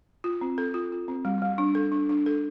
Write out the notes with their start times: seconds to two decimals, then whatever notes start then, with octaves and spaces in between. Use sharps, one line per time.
0.24 F4
0.41 C4
0.58 A4
0.74 F4
0.92 F4
1.08 C4
1.25 G3
1.42 G3
1.58 D4
1.75 A4
1.92 D4
2.09 D4
2.26 A4